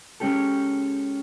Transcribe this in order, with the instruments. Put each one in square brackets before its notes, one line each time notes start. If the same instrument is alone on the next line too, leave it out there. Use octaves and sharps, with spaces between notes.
[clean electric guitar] G#3 C#4 G4 A4